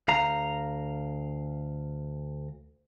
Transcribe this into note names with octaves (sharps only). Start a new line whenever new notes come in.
D2 F5 A#5